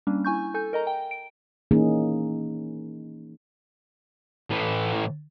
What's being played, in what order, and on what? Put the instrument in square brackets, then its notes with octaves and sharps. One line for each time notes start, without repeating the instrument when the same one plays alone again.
[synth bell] G3 A#3 C#4 D4
E4 G#5 C#6 G6
A4 G#5 G6
A#4 D#5 A#5
G5
D7
[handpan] E3 A#3 C#4 D#4 G#4
[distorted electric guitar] A2 E3